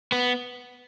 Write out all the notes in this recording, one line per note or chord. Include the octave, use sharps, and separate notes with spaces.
B3